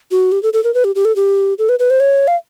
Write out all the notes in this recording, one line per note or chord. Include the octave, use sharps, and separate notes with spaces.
F#4
G4
A4
A4
A#4
B4
G4
G4
A4
G4
A4
B4
B4
C5
C#5
F5